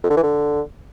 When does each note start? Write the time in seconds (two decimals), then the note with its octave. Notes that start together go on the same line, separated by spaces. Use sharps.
0.04 F2
0.10 D3
0.17 E3
0.23 D3